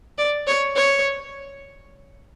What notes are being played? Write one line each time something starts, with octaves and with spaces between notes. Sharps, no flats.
D5
C#5
C#5